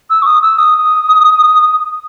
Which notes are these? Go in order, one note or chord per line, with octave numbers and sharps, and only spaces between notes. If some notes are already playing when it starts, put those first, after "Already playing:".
E6
C#6
D#6
E6
D#6